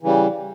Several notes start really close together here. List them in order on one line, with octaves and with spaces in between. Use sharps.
E3 C#3 G3